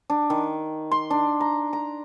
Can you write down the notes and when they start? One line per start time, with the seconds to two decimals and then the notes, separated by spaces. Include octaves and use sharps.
0.10 D4
0.30 D#3
0.91 C6
1.10 D4
1.41 A#5
1.73 A#5